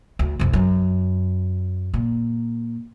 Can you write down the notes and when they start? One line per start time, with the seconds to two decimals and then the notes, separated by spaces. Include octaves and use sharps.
0.19 D2
0.39 C2 F2
0.53 F#2
1.94 A#2